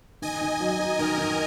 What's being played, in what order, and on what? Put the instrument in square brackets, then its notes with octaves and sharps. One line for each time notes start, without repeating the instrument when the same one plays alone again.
[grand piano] D#3 [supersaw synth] D#5 G#5
[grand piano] D#3
F#3
D#4
[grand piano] D#3 [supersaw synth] A#4 D#5
[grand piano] D#3